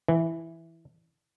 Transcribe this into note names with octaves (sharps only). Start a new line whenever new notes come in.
E3